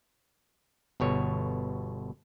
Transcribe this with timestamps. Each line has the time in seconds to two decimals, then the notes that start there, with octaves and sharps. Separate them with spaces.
1.00 G1 B2 C#5